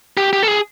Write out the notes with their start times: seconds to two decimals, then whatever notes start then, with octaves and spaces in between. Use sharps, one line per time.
0.17 G4
0.33 G4
0.43 A4
0.48 G#4